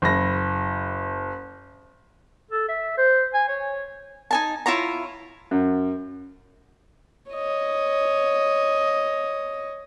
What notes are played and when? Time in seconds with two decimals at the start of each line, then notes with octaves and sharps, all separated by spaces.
0.02 F#1 B5 A#6
2.51 A4
2.68 E5
2.97 C5
3.34 G#5
3.48 C#5
4.31 D#4 G#5 A5
4.66 E4 F4 C#5 A#5
5.51 F#2
7.32 C#5 D#5